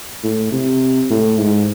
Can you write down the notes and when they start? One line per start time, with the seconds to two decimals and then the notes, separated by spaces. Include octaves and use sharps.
0.24 A2
0.52 C3
1.10 A2
1.38 G#2